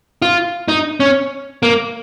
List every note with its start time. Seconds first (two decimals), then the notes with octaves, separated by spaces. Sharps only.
0.22 F4
0.68 D#4
1.00 C#4
1.63 A#3